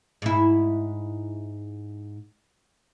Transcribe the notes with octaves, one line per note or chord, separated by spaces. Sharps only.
G#2 E4